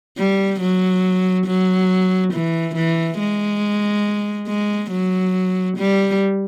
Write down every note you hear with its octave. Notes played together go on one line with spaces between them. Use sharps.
G3
F#3
F#3
E3
E3
G#3
G#3
F#3
G3